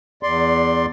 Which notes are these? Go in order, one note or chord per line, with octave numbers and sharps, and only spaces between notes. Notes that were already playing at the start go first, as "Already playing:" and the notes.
E2 D5 C6